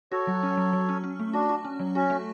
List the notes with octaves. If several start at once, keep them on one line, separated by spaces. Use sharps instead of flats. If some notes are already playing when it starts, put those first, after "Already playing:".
F#4 A4 C#5
F#3
C#4
F#3
F#3
C#4
C#4
A3
D4 F#4
F#4
C#4
F#3
C#4 F#4
A3